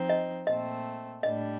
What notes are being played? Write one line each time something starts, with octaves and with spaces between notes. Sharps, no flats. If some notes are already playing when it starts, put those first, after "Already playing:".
Already playing: F3 C4 D#4
D#5
A#2 A3 C4 D#5
A2 G3 D4 D#5